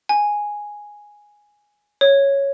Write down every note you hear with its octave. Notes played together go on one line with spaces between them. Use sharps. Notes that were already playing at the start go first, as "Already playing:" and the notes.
G#5
C#5